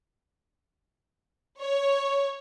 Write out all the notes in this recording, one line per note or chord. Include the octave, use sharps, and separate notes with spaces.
C#5